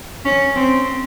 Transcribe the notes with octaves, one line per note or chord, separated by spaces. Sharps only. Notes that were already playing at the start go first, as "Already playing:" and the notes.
C#4
C4